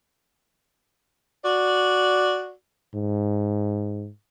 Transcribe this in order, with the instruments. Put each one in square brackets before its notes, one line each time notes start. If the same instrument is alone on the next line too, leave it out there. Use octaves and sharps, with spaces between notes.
[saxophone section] F#4 D5
[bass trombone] G#2